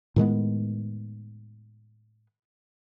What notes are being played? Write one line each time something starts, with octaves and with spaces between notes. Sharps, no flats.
A2 D#3 G#3 B3